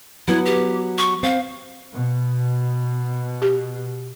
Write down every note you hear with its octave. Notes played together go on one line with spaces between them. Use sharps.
F#3 B3 E4
G4
C#6
C4 F5
B2
G4